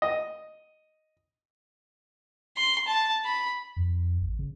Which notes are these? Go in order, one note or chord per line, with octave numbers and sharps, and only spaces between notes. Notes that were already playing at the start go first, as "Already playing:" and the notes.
D#5
C6
A5
B5
F2
A1
C#3